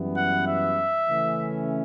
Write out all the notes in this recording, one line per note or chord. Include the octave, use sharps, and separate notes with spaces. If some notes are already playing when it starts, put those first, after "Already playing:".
Already playing: F#2 E3 G3 B3
F#5
E5
C#3 E3 A3 C#4